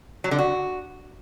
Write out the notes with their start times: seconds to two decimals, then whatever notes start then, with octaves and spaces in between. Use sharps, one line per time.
0.24 F#3
0.31 D3
0.39 F#4